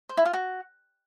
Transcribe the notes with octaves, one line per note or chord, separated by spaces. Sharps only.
C5
E4
F4
F#4